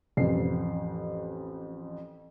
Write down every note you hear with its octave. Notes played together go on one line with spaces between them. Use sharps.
A1 F2 C7